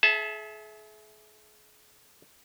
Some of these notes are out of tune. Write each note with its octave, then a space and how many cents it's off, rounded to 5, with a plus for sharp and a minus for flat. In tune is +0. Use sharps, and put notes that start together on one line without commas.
G#4 +40 E5 +0 A5 +0